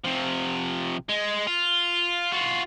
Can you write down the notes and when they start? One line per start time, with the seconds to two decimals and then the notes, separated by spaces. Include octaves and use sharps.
0.04 C3 F3
1.09 G#3
1.47 F4
2.32 F4 F#4